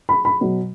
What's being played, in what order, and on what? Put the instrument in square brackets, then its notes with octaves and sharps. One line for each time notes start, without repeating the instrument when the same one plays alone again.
[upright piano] B5
B5
B2 F#3